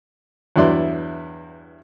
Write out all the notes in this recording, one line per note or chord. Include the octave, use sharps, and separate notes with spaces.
E2 G2 F#3 E4 D5 C6